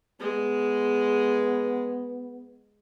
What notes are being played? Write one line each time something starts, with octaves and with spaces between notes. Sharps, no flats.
G#3 B3